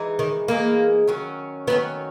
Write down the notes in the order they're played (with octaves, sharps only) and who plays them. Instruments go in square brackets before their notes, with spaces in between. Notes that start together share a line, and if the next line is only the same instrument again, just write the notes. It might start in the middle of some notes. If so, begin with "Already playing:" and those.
Already playing: [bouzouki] E3 G#3 D#4 G#4
[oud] D#3
[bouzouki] E3 G#3 D#4 G#4 [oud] A#3
[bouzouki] D#3 F#3 C#4
[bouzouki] D#3 F#3 C#4 [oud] B3